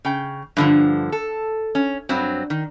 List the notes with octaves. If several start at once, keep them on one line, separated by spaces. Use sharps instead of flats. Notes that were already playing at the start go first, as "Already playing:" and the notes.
C#3 G5
G2 D3 F3
A4
C#4
G2 F#3 C4
D#3